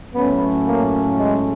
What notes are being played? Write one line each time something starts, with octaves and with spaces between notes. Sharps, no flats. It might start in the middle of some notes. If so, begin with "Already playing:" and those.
A2 F#3 A3 B3 C#4
A#3
G#3